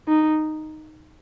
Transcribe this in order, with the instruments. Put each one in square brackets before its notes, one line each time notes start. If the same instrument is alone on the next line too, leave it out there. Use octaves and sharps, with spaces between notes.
[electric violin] D#4